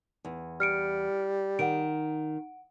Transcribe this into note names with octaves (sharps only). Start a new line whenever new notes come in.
E2
G3 F6 C#7 D7
D#3 F#5 D7